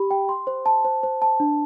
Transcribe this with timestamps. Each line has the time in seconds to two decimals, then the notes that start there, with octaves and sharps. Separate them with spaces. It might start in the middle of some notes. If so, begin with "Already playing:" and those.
Already playing: G4 B5
0.11 G5
0.29 C6
0.47 C5
0.66 A5
0.85 C5
1.03 C5
1.22 A5
1.40 D4